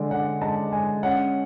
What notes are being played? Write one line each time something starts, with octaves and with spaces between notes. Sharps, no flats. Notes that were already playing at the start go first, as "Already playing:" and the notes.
Already playing: D3 G#3 D4 D5
D3 F#5
G#3 A5
G#3 G#5
C#4 F#5